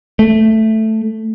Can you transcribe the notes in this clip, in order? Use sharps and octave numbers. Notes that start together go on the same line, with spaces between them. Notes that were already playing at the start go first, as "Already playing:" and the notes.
A3